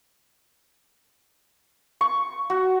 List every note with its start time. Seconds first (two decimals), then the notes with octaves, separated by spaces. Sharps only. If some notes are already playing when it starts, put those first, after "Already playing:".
2.01 C#6
2.50 F#4